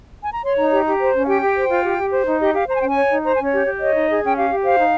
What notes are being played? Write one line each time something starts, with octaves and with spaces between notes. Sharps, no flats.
G#5
A#5
C#5 C6
D#4 A#5
G4 A#5
G4
C5
C#4
F5
G4 G5
G4
C5
F4
G4
G4
C5
D#4
G4 D#5
G4 F5
C5 A#5
G#5
C#4 G5
G#5
C#5
D#4
C5 A#5
G#5
C#4 C#5
G4
G4
C#5 D#5
D#4
G#4
C#4 G5
G4 F5
G4
C5 F5
D#4